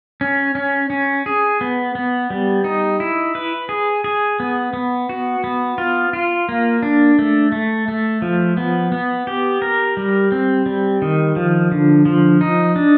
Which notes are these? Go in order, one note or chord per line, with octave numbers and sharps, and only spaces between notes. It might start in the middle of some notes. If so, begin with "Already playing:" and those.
C#4
C#4
C#4
G#4
B3
B3
G3
D#4
E4
B4
G#4
G#4
B3
B3
F#4
B3
F4
F4
A#3
D4
A3
A3
A3
F3
B3
B3
G4
A#4
G3
C4
G3
D#3
F3
D3
F3
D#4
D4